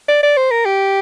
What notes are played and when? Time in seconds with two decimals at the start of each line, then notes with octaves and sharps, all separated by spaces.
0.08 D5
0.23 D5
0.37 C5
0.51 A#4
0.66 G4